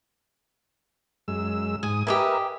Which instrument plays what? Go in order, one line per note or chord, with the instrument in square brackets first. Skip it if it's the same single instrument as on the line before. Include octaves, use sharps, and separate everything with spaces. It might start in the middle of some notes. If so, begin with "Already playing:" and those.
[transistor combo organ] F#2 G#3 E6
[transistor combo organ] G#2 D#6 [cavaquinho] G#5
[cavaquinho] G4 D#5 G#5 [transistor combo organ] A#4 B4 E5